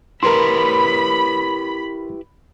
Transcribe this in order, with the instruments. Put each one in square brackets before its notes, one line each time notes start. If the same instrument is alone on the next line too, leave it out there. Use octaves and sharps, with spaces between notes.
[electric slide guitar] E4 G4 B4 [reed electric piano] A#4 C6 [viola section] B5